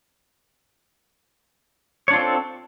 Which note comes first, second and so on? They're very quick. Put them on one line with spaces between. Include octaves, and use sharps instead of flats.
C#5 D4 F4 C4 A4